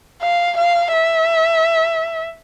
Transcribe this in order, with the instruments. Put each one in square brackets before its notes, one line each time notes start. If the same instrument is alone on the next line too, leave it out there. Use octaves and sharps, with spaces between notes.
[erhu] F5
F5
E5